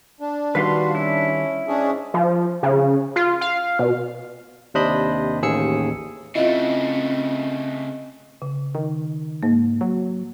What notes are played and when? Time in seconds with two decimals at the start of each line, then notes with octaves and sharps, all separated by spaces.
0.21 D4
0.55 D#3 G3 F#4 B4 F5 C6
0.95 C#4 E4
1.68 G#2 C#4 D4 G#4
2.14 F3
2.63 C#3
3.16 F4
3.41 F5
3.79 B2
4.74 D#2 C3 D4 C5 D#5 B5
5.42 A1 D#2 G#4 E6 C#7
6.35 C#3 A3 C4 E4 F4 D#5
8.42 C#3
8.75 D#3
9.43 G#2 A#3
9.81 F#3